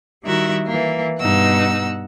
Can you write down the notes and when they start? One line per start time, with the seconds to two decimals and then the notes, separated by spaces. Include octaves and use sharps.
0.23 D#3 G3 E4 F#4 A#4 E5
0.66 E3 A#3
1.19 G2 B2 D#4 F#5 E6